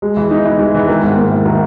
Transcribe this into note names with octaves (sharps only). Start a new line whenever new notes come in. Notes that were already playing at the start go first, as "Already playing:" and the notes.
G#3
E3
D#4
E3
G#3
E3
D#3
G#2
A#3
E4
D#3